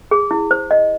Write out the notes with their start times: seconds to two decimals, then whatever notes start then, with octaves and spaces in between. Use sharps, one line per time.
0.11 G#4
0.31 E4
0.51 C5
0.71 D#5